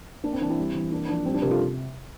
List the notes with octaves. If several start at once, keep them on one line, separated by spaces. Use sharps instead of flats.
A#3 D4
C4
E3 D4
C4 E4
G3
E3
A#3 D4
F3 D4
G3 C4
D4
C3 G4 A#4
F4 A4